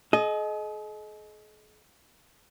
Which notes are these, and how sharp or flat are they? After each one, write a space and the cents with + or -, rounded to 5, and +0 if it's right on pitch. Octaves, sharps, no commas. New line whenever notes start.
G#4 +45 D#5 +0